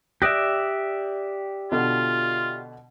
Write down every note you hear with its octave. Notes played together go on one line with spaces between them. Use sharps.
G4 D5 E5 D#6 F#6 A#6
B2 D3 F4